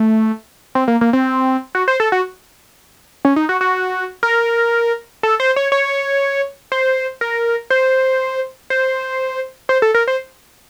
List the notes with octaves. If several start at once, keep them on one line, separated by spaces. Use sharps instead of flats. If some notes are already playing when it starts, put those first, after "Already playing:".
Already playing: A3
C4
A#3
A#3
C4
F#4
C5
A4
F#4
C#4
D#4
F#4
F#4
A#4
A4
C5
C#5
C#5
C5
A#4
C5
C5
C5
A4
A#4
C5